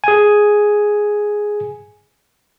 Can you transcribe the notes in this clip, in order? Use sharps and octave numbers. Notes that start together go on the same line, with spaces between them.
G#4 G#5